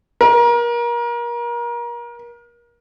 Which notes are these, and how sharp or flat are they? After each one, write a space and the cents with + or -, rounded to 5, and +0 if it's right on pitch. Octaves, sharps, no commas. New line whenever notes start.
A#4 +30